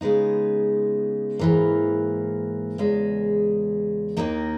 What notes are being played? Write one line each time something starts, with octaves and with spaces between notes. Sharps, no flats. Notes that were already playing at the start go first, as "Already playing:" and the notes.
C#3 G#3 B3 D#4
G#2 E3 A#3
E2 C#3 G#3
D#2 D#3 A#3 D#4